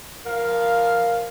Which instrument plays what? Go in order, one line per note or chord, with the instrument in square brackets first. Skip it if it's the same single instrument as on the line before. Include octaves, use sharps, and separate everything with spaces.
[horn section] F3 F5 [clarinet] A#4